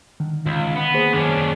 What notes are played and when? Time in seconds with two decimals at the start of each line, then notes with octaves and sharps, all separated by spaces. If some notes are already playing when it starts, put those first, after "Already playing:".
0.20 D3 D#3
0.46 C#2
0.76 B3
0.94 A#3 G#4 C5
1.14 F#2 D#3 C#4 D4